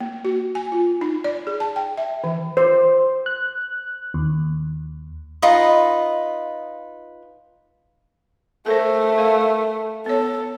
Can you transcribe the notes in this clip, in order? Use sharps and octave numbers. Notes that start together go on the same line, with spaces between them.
A#3
F#4
G#5
F4
D#4
D5
G#4
A5
G5
E5
E3
C5
F#6
D#2
D#4 F4 B4 D#5
A3 A4 A#4 C5
A#4 F5
B3 A4 C#5